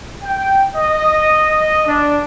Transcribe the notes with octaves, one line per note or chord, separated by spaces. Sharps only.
G5
D#5
D4